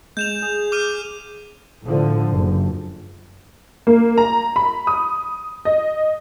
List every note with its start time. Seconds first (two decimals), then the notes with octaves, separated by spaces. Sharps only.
0.17 G#3 G6 E7 F7
0.42 G#4
0.72 D6 F6 D#7
1.83 A2 D3 F3
2.28 F#1
3.87 A#3
4.18 A#5
4.56 B5
4.87 D#6
5.65 D#5